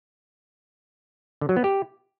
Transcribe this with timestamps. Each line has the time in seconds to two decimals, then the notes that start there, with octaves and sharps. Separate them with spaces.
1.41 D3
1.49 F#3
1.56 B3
1.64 G4